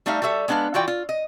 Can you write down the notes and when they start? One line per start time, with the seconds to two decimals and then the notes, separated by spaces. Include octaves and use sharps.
0.06 G3 A3 D#4 E5 F5
0.22 G3 F#4 A4 E5
0.48 G#3 B3 D4 B4 F5
0.74 E3 F4 F#4 D5 G5
0.88 F4
1.09 D#5